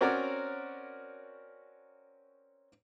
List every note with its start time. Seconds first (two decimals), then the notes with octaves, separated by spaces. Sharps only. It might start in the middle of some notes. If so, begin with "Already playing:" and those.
0.01 C4 C#4 F#4 A#4 C#5 D5